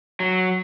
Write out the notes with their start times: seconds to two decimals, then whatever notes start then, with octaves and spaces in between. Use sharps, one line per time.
0.20 F#3